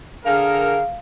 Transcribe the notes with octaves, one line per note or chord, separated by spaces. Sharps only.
D3 G#4 A#4 F5